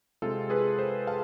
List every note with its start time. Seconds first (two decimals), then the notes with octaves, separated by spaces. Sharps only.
0.22 C3 G#3 C4 F4 A4
0.50 G#4 B4
0.79 A4 C5
1.07 F5 A5